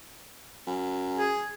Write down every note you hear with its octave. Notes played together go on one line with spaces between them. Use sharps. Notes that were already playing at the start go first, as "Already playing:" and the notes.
F#2
G#4